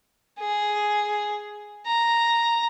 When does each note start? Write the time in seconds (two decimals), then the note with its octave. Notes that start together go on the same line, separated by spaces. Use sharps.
0.39 G#4
1.86 A#5